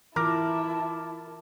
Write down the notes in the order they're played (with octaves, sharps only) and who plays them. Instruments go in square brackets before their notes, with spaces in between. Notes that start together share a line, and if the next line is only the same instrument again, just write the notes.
[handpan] E3 F4 [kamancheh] E4 A5 [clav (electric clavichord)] A#4 [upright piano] D6